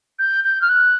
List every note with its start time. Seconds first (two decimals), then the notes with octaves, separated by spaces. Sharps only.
0.19 G6
0.44 G6
0.61 F6
0.69 F#6